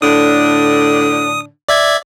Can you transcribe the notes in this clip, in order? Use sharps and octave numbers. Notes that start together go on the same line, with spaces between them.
A2 D3 D4 D#6
D5 E5 G#6